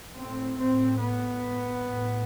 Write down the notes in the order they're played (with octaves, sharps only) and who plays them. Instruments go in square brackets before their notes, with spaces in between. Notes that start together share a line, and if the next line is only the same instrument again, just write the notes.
[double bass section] A2 C4
C4
B3
A2